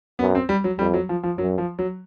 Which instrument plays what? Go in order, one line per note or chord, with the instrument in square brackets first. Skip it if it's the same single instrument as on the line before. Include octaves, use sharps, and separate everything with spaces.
[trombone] F#2 [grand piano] B3
[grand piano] C4
G3
F#3
[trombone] F2 [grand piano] G3
[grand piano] F#3
F3
F3
[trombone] F#2 [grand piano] F#3
[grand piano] F3
F#3